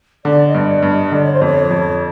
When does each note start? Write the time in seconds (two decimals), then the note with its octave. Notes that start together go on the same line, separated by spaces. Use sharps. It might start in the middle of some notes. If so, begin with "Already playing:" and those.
0.25 D3 D5
0.47 D#5
0.54 G2
0.68 D5
0.82 G2
0.90 D#5
1.12 D3 D5
1.23 C#5
1.33 C5
1.41 F2 C#5
1.71 F2